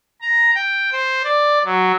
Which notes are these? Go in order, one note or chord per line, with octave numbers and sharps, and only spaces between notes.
A#5
G5
C5
D5
F#3